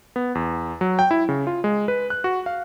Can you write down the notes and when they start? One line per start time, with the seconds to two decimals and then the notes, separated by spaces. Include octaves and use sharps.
0.16 B3
0.35 E2
0.81 F#3
0.99 G5
1.11 E4
1.29 C#3
1.47 F4
1.64 G#3
1.88 B4
2.10 F#6
2.24 F#4
2.46 F5